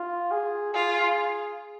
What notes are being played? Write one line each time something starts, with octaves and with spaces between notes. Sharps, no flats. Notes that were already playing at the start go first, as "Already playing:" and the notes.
Already playing: F4
G#4
F4 G#4